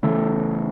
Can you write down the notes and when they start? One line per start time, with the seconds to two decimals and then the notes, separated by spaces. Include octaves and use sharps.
0.03 C#3 E3 A3